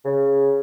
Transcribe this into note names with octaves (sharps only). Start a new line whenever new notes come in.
C#3